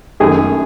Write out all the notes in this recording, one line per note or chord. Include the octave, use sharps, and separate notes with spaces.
F#2 D#3 A3 G#4